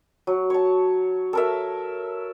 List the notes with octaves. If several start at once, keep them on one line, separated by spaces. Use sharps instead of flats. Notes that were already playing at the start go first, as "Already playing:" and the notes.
F#3
C#5 A5
A4 A#4 E5